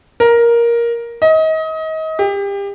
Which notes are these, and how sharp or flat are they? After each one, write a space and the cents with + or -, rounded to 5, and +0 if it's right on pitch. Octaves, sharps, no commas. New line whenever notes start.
A#4 +10
D#5 +30
G4 +30